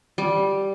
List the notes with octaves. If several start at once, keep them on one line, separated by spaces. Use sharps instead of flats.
G3